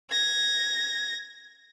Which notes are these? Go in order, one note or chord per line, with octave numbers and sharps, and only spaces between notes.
G#6 A#6